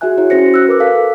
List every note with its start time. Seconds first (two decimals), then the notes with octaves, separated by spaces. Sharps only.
0.01 F#4 G#4 E5 G#5 F#6
0.18 E4 F#4 C#5
0.30 C#4 F#4 C5 A#6 C#7
0.54 E6 F#6
0.68 A#4 B4 D6 E6
0.80 A4 F5 B6